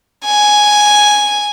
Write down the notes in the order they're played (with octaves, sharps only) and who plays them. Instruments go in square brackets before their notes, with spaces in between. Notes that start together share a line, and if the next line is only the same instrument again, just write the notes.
[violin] G#5